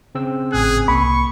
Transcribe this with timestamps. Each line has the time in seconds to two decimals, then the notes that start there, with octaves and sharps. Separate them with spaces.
0.15 C#3 C4 E6
0.52 G#1 A2 G#4 F#6
0.88 C2 A#3 B5 C#6